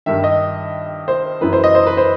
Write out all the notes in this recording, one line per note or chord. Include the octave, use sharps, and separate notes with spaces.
G2 D#3 E5
D#5
C5
F#2 E3 B4
C5
D#5
C5
B4
C5